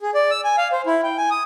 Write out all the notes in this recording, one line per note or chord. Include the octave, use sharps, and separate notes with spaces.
G#4
D5
E6
G#5
F5
C5
E4
G5
G#5
D#6